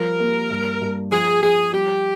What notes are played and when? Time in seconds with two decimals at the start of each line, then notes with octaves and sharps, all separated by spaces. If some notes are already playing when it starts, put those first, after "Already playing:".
Already playing: F3 G3 A#4
0.20 A#3
0.50 G2
0.81 G2
1.11 F3 G#4
1.42 F3 G#4
1.73 G3 G4